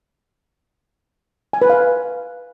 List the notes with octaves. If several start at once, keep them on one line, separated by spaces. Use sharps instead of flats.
G#5
B4
F5